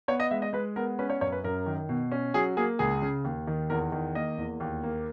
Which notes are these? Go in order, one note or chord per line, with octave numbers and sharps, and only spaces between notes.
B3 C#5
D#5
G#3 E5
D#5
G#3 B4
B3 A#4
C#4 B4
C#5
F#2 C#5
B4
F#2 A#4
D#3
B2
C#4
F#3 G#4
A#3 G#4
C#2 G#4
C#3
D#2
D#3
E2 A#4
D#3
A#3 D#5
E2
D#2
A#3